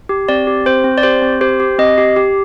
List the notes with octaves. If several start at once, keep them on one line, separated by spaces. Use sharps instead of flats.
G4
C4 D5
G4
C4 C5
C4
D5
G4 C5
C4
G4 C5
G4
C4 D#5
G4
G4